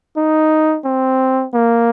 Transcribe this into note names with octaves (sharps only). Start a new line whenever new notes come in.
D#4
C4
A#3